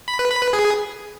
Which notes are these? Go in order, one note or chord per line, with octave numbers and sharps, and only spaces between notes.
B5
B4
B5
B4
G#4